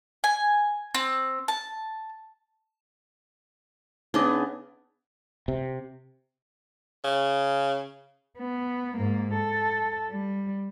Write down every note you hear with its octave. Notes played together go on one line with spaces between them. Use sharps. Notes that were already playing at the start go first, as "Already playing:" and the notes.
G#5
C4
A5
C#3 B3 D4 D#4 D#5 D6
C3
C#3
B3
G#2 A#3
A4
G3